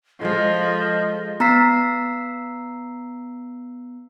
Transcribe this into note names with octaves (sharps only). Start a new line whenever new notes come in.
F3 G#3 A4 D#5
B3 A#5 E6 B6 C7